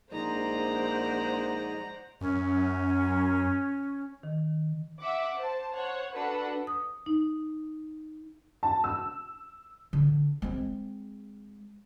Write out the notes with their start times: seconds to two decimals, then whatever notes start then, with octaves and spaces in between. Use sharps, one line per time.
0.12 A#1 G#3 D#4 C5 D5 F#5 A#5
2.21 F#2 C#4
4.23 D#3
5.00 E5 F#5 D6
5.38 C5 A5
5.73 C5 C#5 F#5
6.13 D4 F#4 A4 B4 F#5
6.67 D#6
7.06 D#4
8.63 A5
8.84 E6
9.93 D3
10.42 G#3 C4